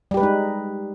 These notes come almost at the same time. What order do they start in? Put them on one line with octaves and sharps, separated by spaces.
G3 G4 B4 G#3 D#4